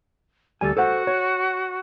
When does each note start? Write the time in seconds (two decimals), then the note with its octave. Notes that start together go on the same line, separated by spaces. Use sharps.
0.61 D2 G3 A4 G#5
0.77 F#4 A4 C5 F#5
1.07 C#5